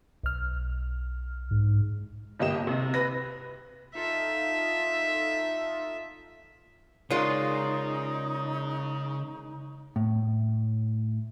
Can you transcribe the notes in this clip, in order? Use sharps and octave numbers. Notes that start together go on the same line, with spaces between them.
B1 F6
G#2
G1 A#3 G4 D#5 E7
C3
B4 A#6
D#4 F4 A4 E5
C#3 G#3 D#4 F4 A#4 C#5 D5
A2